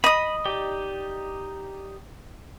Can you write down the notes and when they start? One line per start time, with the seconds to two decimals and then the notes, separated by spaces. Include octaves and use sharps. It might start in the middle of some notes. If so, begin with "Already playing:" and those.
0.04 D#5 B5 D#6
0.45 D#4 G4 D5